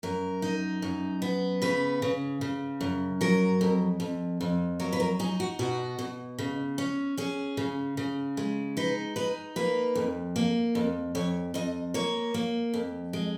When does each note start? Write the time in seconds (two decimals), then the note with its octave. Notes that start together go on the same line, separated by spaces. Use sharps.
0.03 F#2 A#4
0.42 D#4
0.82 F#2
1.22 B3
1.62 C#3 B4
2.02 C#3
2.41 C#3
2.81 F#2
3.21 F#3 A#4
3.61 F2
4.00 F2
4.41 F2
4.80 F#3 A#4
4.93 B4
5.00 A#4
5.19 D#4 G#4
5.40 F#4
5.59 B2 F#4
5.99 B2
6.38 C#3
6.78 C#4
7.17 C#4 G#4
7.57 C#3
7.97 C#3
8.37 G#3
8.77 D#4 B4
9.16 D#4 B4
9.56 A#3 B4
9.95 F2
10.36 A#3
10.75 F2
11.15 F2 C#5
11.54 F2 D#5
11.94 A#3 C#5
12.34 A#3
12.74 F2
13.13 G#3